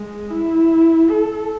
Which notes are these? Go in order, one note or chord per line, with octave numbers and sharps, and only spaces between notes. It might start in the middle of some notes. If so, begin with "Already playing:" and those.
Already playing: G#3
E4
A4